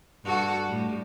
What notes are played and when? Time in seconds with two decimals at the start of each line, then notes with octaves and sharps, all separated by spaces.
0.24 G2 F#4 A4
0.67 A2 G3